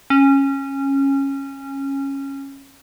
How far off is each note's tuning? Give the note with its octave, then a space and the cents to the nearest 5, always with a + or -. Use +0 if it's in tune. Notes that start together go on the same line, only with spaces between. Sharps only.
C#4 -15